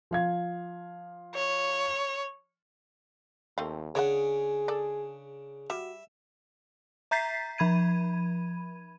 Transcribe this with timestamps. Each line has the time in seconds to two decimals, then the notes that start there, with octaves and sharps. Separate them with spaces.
0.11 F3 F5 G#6
1.35 C#5
3.58 D#2 A3 C4 F5
3.95 C#3 D4 G#4 C#5 D5 F#5
4.68 A4 D5
5.70 G3 F#4 E5
7.11 E5 A#5 G6 A6 B6 C7
7.58 F3 B5 G#6 D#7